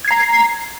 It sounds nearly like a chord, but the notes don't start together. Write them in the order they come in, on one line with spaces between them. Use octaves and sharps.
G#6 C7 A#5